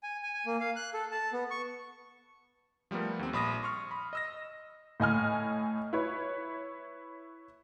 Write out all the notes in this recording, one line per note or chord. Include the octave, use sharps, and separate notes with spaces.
G#5
G#5
G#5
A#3
F5
F#6
A4
A5
B3
C#6
F3 G3 A3 B3 A#4
D#2 C4
A#1 B5 D#6 A#6
C6 C#6 F6
B5
D#5 E6 A#6
A2 D#5 G#5 F6
E4 B4 C#5